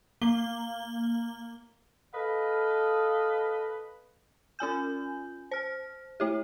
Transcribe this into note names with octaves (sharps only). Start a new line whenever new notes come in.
A#3 G7
A4 B4 D#5 F5
C#4 F4 G#5 G6
C5 F6
A3 E4 G4